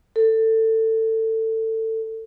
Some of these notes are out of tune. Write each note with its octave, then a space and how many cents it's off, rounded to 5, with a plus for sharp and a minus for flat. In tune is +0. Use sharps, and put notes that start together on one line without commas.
A4 +20